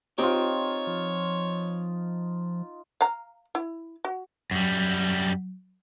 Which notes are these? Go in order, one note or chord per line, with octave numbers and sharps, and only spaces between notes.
C4 D#4 F4 G4 C#5
F3
F5 A#5
E4
F#4
F#2 F#3 G3